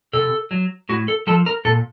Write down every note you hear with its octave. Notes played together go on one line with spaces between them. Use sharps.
C3 A4
F#3
A2 F#4
A4
F3 A4
A#4
A#2 A4